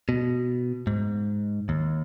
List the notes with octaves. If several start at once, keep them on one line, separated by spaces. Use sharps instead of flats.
B2
G#2
D#2